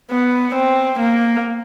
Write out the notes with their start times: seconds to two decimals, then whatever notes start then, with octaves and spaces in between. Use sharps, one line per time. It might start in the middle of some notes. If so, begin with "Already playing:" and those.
0.11 B3
0.55 C4
0.99 A#3